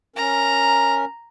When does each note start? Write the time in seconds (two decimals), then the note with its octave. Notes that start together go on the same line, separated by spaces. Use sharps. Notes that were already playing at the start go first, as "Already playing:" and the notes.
0.16 C#4 A#4 A#5